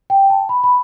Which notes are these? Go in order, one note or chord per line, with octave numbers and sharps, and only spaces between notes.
G5
A5
B5
B5